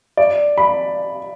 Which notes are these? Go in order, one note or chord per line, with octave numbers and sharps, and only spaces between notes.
D5
B5